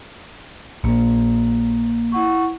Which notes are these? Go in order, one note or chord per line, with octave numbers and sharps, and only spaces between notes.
A#1 A#2 A#3
E4 F#5 C#6